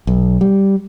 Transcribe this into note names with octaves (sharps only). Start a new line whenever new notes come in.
B1
G3